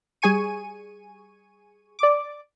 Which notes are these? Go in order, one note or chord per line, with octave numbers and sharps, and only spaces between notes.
G3 G#4 G#5 C#6 D#7
D5 D6